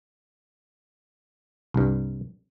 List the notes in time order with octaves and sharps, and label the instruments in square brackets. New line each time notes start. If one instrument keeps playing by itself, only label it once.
[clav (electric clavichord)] C2 G2